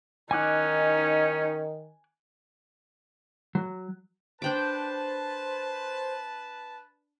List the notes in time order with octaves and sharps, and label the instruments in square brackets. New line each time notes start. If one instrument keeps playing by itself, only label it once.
[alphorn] D#3 [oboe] C#4 [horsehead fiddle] D#4 [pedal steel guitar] G#5 D6 F#6
[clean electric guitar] F#3
[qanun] D4 G5 D6 [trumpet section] B4 A5 [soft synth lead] C5